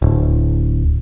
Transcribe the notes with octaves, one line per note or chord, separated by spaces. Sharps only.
D1